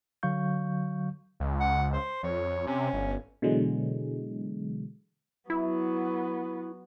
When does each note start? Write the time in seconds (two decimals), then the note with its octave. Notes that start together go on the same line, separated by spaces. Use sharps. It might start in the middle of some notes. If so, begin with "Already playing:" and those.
0.23 D3 F#3 F5 C#6 G6
1.40 C#2
1.60 F#5
1.93 C5
2.23 F2 C#5
2.67 C3 C#4
2.93 G1
3.42 B2 D3 E3 F#3 G#3
5.50 F#3 B3 E4